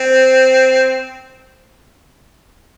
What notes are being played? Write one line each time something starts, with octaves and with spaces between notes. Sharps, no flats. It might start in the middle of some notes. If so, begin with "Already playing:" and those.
Already playing: C4